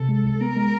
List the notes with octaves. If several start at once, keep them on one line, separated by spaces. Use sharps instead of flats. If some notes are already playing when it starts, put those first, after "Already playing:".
Already playing: C3 A4
G#3
C2
B3 A#4
G#3